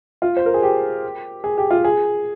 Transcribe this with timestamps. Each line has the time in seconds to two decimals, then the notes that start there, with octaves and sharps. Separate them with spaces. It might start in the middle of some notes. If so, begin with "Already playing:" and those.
0.22 F4
0.37 C5
0.46 A#4
0.54 G#4
0.63 G4
1.44 G#4
1.58 G4
1.71 F4
1.84 G#4